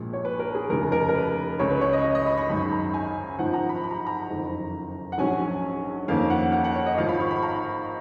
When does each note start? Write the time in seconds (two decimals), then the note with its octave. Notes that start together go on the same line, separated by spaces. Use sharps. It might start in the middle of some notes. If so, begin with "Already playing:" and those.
Already playing: A#1 A#2 G#3
0.13 C#5
0.25 B4
0.39 A#4
0.55 G#4
0.69 F1 D#2 C#3 G#3 A#4
0.92 A#4
1.09 A#4
1.15 B4
1.59 C#2 C#3 G#3 C#5
1.70 B4
1.81 C#5
1.93 D#5
2.04 D#5
2.15 D#5
2.26 B5
2.38 C#6
2.49 G#1 F#2 D#3 G#3 B5
2.72 A#5
2.94 G#5
3.39 G#1 G#2 F3 F#5
3.54 A#5
3.69 B5
3.84 B5
3.91 A#5
3.98 B5
4.07 A#5
4.28 F#1 F2 D#3
5.12 F#5
5.18 A#1 G#2 F#3 C#4 G#5
6.08 F2 D#3 A#3 C#4 F5
6.30 F#5
6.52 F#5
6.64 F#5
6.75 C#5
6.86 D#5
6.98 G#1 G#2 F3 F5
7.09 B5
7.20 C#6
7.31 B5
7.43 A#5